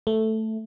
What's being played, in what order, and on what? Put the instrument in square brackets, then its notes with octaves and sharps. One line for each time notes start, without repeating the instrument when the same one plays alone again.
[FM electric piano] A3